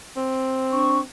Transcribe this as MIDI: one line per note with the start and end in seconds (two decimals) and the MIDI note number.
0.16 1.03 60
0.70 0.98 62
0.70 0.98 85